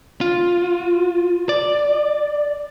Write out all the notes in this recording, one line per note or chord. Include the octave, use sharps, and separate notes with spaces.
F4
D5